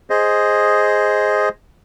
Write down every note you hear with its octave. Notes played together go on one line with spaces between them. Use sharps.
G#4 C5 D#5